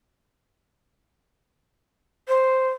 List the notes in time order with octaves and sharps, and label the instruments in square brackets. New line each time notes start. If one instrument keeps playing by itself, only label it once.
[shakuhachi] C5